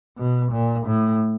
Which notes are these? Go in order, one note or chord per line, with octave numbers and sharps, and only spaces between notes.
B2
A#2
A2